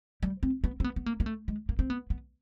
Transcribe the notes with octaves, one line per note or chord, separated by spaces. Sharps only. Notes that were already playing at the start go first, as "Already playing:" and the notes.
G3
C4
B3
C4
B3
B3
A#3
A#3
A3
G#3
A#3
C4
B3
B3